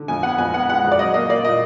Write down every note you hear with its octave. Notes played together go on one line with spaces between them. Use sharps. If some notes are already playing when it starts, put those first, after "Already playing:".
Already playing: D3
F2 G#5
B3 F#5
F2 G#5
B3 F#5
G#3 F#5
F2
D5
F#3 D#5
A#3 D#5
A#3 D5
A#2 D#5